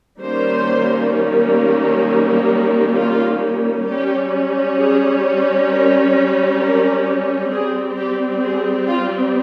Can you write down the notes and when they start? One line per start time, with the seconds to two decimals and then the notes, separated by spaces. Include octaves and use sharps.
0.21 D#3 G3 A#3 C#4 C5
2.95 F4
3.86 G3 C#4 G4
4.77 G#4
5.69 A#4
6.61 A#4
7.51 G3 C4 G#4
7.97 G4
8.43 G#4
8.88 F4